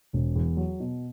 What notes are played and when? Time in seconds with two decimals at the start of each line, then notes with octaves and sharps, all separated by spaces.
0.13 E1
0.36 E2
0.57 F#3
0.80 B2